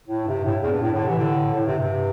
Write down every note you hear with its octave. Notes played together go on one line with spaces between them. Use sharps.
A2
G2 C3
A2
E2
G2
A2
A2 D3
C3 E3
A2 D3
A2
G2 C3
G2 C3